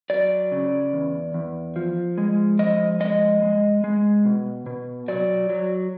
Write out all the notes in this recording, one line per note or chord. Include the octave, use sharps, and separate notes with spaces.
F#3 D5
C#3
E2
E2
F3
G#3
F3 D#5
G#3 D#5
G#3
G#3
B2
B2
F#3 D5
F#3